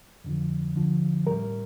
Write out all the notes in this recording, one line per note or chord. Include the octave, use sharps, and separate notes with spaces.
F2 D3 F3
D2 D3 F3
A2 G3 A#4